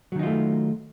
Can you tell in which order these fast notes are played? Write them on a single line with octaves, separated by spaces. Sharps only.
F#3 D#3 D#4 F4 A3